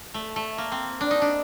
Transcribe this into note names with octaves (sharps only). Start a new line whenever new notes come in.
A3
A3
A#3
C4
D4
D#4
D4